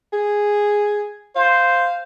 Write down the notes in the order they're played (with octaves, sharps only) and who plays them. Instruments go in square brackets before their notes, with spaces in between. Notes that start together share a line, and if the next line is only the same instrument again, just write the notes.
[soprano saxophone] G#4
[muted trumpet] C5 [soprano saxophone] F5